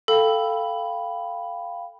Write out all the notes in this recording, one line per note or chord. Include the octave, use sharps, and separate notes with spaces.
A4 F5 G5 B5